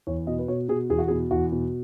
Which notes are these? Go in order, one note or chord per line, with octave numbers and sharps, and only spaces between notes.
E2 C#5
B2 D#5
B4
B2 C#5
B2 G#4
E2 G#4
F#4
G#4
B2
E2 F#4
B2